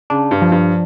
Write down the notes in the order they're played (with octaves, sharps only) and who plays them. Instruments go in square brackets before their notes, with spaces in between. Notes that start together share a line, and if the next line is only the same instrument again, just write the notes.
[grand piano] C#3 [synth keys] D4
[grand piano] G2
[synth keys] F3
[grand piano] G2